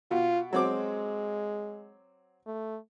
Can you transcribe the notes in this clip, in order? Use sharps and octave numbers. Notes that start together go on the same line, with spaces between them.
B2 F4
F#3 G#3 C4 D6
A3